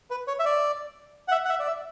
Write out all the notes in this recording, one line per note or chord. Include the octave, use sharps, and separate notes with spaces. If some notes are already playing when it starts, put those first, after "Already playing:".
B4
C#5
E5
D5
F#5
E5
F#5
E5
D5
E5